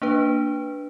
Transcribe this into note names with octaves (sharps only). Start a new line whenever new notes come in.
A#3 D4 B4